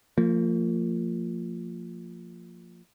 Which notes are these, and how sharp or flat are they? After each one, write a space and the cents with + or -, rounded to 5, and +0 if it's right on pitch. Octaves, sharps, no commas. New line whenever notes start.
F3 +0 A#3 -35